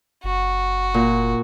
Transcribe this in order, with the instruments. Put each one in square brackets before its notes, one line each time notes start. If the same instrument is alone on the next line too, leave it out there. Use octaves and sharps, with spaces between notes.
[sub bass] F#1 [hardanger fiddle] F#4
[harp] A#2